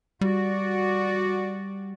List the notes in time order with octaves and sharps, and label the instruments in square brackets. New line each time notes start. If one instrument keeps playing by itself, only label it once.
[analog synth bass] G3 [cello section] F#4 D5